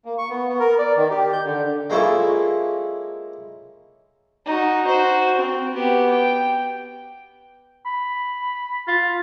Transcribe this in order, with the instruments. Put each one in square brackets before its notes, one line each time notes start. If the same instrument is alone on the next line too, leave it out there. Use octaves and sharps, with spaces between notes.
[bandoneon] A#3
C#6
B3
B3
A#4
D5
D#3
G4
G6
D3
[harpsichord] G#3 A#3 C#4 E4 F4 A4
[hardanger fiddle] D#4 F#4
F#4 C5
C4
B3 G4
G5
[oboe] B5
[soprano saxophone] F4